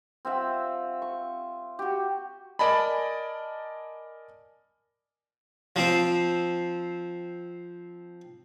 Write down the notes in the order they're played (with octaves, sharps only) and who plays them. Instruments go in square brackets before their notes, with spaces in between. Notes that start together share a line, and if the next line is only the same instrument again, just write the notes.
[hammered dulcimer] C4 F4 E5 F#5
C#6
F#4 G4
[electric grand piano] A#4 D5 D#5 G#5 A5 B5
[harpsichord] F3 C4